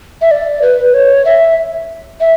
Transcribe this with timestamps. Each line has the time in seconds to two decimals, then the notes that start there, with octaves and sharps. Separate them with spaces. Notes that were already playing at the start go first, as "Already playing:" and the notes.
0.21 E5
0.31 D5
0.62 B4
0.94 C#5
1.25 E5
2.21 E5